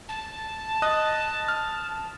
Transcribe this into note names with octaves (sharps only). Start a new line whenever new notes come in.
A5
D#5 D#6 F#6
F6